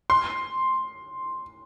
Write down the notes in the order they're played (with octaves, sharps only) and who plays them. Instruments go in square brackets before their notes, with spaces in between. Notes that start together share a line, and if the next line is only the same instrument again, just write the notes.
[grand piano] C6